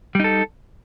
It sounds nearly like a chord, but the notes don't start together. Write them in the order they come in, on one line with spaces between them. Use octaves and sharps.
G3 D#4 A4